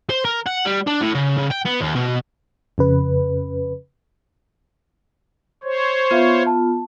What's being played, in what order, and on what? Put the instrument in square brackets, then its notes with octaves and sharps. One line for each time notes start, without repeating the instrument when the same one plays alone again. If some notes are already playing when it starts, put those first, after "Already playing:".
[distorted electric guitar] C5
A#4
F#5
G3
D4
A2
C#3
C#3
G5
B3
D#2
B2
[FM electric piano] F2 C#3 B4
[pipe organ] C5 C#5
[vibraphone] B3 F4 [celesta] B4 E5 F5
[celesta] A5